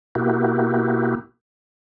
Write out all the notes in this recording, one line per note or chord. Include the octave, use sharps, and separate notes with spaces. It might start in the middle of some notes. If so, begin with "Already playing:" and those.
B2 A#3 E4 F#4 G4